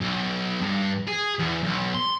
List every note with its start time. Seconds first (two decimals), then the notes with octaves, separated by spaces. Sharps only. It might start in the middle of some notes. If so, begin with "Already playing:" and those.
0.01 B1
0.61 G2
1.07 G#4
1.39 E2
1.63 B1
1.95 C6